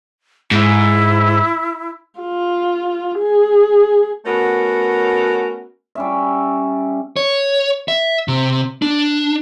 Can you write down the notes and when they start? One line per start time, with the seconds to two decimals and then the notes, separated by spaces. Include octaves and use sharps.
0.51 G#2 E4
2.20 F4
3.19 G#4
4.26 A3 B3 C#4 F#4 A#4
5.95 G3 C#4 E5
7.17 C#5
7.88 E5
8.28 C3
8.82 D4